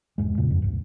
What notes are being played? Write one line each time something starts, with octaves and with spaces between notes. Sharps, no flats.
E1 C#2 G2 G#3
F2 A#2 C#3
F2
C#2 G2